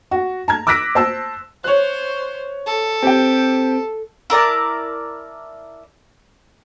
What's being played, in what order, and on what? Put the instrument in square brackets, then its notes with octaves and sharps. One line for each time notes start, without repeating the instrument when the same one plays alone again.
[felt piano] F#4
A5 A#5 G#6
D6 E6 F#6 A#6 B6 D7
C5 A5 E6
[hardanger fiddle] C5 [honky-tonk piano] C#5 F#6
[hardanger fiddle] A4
[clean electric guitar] C4 [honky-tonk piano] G4 G5
[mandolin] E4 A#4 D5 A5